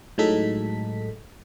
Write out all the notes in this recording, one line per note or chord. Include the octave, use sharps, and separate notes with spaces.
A2 F#3 G#3 D#4 A4 B6